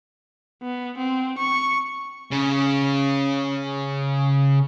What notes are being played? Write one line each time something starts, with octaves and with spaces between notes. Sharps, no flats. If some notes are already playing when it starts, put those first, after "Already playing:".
B3
C4
C#6
C#3 C#4